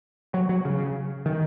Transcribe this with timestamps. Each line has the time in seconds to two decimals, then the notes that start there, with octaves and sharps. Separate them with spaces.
0.34 F#3
0.49 F#3
0.65 C#3
1.26 D#3